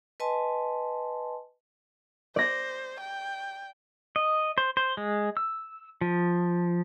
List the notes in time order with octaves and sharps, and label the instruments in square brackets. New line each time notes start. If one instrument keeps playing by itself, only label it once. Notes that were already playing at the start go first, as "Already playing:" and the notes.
[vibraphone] B4 D#5 G#5 A5 C6
[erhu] C5 [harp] D5 A#6
[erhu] G5
[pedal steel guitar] D#5
C5
C5
G#3
E6
F3